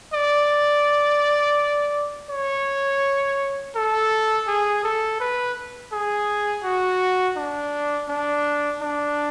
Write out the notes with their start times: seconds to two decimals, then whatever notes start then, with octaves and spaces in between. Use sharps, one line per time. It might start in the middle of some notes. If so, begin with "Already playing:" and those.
0.14 D5
2.30 C#5
3.75 A4
4.48 G#4
4.84 A4
5.20 B4
5.92 G#4
6.64 F#4
7.37 D4
8.09 D4
8.82 D4